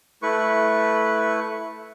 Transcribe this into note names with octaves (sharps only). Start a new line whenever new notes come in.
A3 E4 B4 C#6